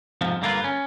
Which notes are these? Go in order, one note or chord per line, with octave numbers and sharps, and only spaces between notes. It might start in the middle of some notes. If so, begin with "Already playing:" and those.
F2 G#2 C3 F3
G2 D3 A#3 D4 F4 B4
C#4